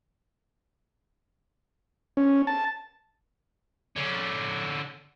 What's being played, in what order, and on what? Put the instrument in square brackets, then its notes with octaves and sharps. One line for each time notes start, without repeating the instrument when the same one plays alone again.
[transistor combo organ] C#4
A5
[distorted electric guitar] D3 C#4